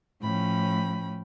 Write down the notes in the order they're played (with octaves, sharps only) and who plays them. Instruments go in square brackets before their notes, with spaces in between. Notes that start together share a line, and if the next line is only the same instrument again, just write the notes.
[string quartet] A2 F3 C#4 G5 B5